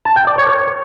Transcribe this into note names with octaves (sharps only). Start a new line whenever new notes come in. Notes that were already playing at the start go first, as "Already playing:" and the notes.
A5
G5
D5
C#5
C#5